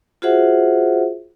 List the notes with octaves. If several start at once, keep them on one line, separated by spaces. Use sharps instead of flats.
F4 F#4 G#4 C5 E5 F#5